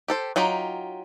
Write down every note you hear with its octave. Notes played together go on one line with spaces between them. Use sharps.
G4 A4 C5
F#3 D#4 F4 G4